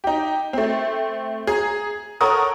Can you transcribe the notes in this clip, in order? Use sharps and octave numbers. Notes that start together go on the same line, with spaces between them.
D#4 G4
A3 C4
G#4 A#5
A4 A#4 C#5 F#5 D#6